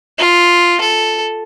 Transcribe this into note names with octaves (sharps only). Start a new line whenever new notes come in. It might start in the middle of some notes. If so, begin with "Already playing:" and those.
F4
A4